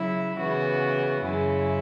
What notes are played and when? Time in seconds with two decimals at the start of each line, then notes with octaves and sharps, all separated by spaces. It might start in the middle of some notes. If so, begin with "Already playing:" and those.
Already playing: C#3 F#3 E4
0.36 C#3 E3 B3 F#4
1.23 F#2 C#3 G#3 E4